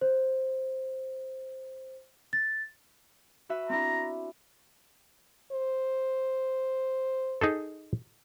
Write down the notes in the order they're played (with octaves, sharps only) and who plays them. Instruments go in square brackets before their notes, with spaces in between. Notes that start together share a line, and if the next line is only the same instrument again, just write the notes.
[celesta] C5
A6
[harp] F#4 B4 E5
[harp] C4 D4 E4 [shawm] A#5
[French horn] C5
[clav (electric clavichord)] D#4 G#4 A4